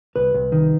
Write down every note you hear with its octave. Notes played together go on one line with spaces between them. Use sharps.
C2 B4
C2
D#3